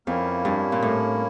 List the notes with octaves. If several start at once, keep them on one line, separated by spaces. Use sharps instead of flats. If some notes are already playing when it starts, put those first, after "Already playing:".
F2 A#3 C#4 E4
G2
A#2
A2